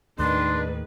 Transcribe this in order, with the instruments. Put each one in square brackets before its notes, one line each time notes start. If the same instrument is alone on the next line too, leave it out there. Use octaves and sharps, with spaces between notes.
[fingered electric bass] D#2 A2 [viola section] D#3 G#3 B4 [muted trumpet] D4 [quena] C6